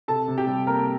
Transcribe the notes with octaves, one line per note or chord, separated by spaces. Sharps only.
C3 A4 A5
C3
G4 G5
G3
A#3 A#4 A#5